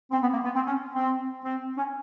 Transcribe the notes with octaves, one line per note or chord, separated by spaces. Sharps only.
C4
B3
A#3
B3
C4
C#4
C4
C4
C#4